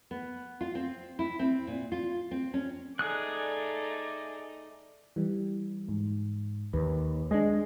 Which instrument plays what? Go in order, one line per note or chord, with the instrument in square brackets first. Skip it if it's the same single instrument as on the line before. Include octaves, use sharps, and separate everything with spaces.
[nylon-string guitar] B3
F4
C4
E4
C4
A#2
F4
C4
C#4
[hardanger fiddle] A3 D#4 [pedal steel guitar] G#4 D#6 F#6 [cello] D5
[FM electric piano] E3 G3
G#2
[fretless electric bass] D#2 [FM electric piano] B4
[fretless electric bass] G#3 [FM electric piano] D4 G#4 D#5